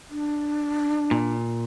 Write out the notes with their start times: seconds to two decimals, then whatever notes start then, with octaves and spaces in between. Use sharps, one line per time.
0.11 D4
1.11 A#2